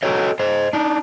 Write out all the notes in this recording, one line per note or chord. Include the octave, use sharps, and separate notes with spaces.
F#4 A4 C#5 D#5
C5 D#5
D4 D#4